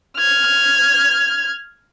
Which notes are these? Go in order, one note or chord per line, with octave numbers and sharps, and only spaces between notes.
F6 G#6